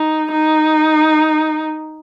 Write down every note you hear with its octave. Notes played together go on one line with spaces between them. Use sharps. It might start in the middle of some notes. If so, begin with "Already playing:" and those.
Already playing: D#4
D#4